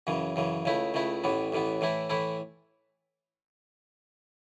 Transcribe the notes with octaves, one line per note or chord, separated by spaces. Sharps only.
F#2 C#3 E3
F#2 C#3 E3
C#2 C#3 A3 E4
C#2 C#3 A3 E4
A1 A2 E3 B3
A1 A2 E3 B3
A2 E3 A3 E4
A2 E3 A3 E4